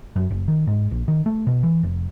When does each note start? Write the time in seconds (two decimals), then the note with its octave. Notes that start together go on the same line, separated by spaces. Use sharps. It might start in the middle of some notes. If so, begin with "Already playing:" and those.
0.16 F#2
0.31 F#1
0.48 D#3
0.67 G#2
0.91 A#1
1.08 D#3
1.26 A3
1.47 B2
1.63 E3
1.83 F1